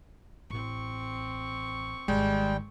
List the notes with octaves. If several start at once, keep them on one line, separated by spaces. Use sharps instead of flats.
A1 C4 C#6
G#1 D#3 G3 G#3 G5